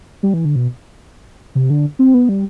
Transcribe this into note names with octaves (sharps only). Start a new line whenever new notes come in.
G3
E3
D3
B2
C3
D3
C4
B3
G3